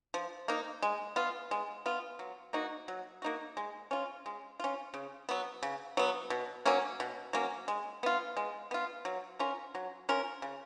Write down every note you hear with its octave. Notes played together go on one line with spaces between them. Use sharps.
F3
A#3 D#4
G#3
B3 F4
G#3
B3 F4
F#3
A#3 D#4 F#4
F#3
A#3 D#4 F#4
G#3
C#4 F4
G#3
C#4 F4
C#3
F#3 B3
C#3
F#3 B3
B2
F#3 A#3 C#4
B2
F#3 A#3 C#4
G#3
B3 F4
G#3
B3 F4
F#3
C#4 F4 A#4
F#3
C#4 F4 A#4
C#3